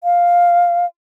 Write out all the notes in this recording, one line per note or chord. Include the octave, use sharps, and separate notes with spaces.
F5